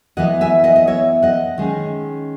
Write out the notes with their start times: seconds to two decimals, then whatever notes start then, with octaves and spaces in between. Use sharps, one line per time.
0.17 E3 B3 D#5 F#5
0.41 E5 G#5
0.64 D#5 F#5
0.76 D#5
0.87 C#5 E5
1.22 D#5 F#5
1.58 D#3 G#3 C#4